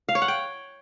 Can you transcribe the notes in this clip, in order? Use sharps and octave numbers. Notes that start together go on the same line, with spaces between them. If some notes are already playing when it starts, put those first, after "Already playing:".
F5
C#5
F#5
G5